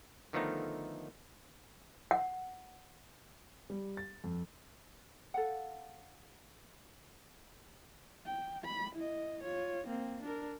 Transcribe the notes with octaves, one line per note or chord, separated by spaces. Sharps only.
D3 D#3 F3 A3 B3 D#4
F#5
G3
A6
F2
A4 F5 F#5
G5
B5
E4 D#5
F4 C#5
A#3 C4
D4 A#4